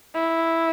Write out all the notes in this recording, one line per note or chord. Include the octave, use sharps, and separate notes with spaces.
E4